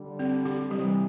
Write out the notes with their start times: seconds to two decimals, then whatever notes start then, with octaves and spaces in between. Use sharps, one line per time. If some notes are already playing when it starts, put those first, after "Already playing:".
Already playing: D3 G3
0.19 C4
0.45 G4
0.70 C3 E3 G3